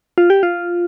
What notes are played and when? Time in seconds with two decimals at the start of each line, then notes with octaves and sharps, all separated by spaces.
0.18 F4
0.30 G4
0.43 F4